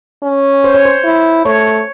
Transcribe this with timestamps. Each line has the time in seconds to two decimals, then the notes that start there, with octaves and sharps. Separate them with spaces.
0.23 C#4
0.64 C5
0.74 C#5
0.85 C5
1.04 E4
1.45 A3 C#5